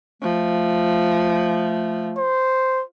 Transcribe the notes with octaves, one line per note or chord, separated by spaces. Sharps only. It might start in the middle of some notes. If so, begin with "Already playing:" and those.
F3 A3
C5